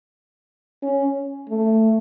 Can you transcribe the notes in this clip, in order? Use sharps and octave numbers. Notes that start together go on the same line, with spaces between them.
C#4
A3